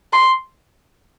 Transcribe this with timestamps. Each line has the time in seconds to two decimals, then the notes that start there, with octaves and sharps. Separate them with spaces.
0.13 C6